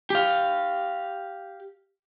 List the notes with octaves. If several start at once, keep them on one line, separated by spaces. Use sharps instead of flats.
G4 F5